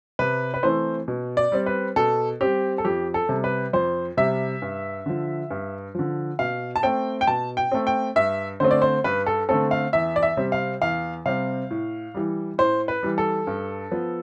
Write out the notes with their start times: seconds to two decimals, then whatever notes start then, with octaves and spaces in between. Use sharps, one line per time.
0.19 C3 B4
0.54 B4
0.63 E3 A3 C4 C5
1.08 B2
1.37 D5
1.52 G3 C4
1.66 B4
1.96 B2 A4
2.41 G3 C4 G4
2.78 A4
2.85 F2 G4
3.14 A4
3.29 C3 G3
3.44 B4
3.73 F2 C5
4.17 C3 G3 E5
4.62 G2
5.06 D3 F3
5.50 G2
5.95 D3 F3
6.39 B2 F5
6.76 A5
6.83 A3 C4 G5
7.21 G5
7.27 B2 A5
7.57 G5
7.72 A3 C4
7.87 G5
8.16 G2 E5
8.60 D3 A3 C4 C5
8.71 D5
8.82 C5
9.04 G2 B4
9.26 A4
9.49 D3 A3 C4 A4
9.71 F5
9.93 E2 E5
10.16 D5
10.23 E5
10.37 C3 G3 C4
10.52 F5
10.82 E2 F5
11.26 C3 G3 C4 F5
11.71 A2
12.14 E3 G3
12.58 A2 C5
12.88 B4
13.03 E3 G3
13.18 A4
13.47 G2
13.91 F3 B3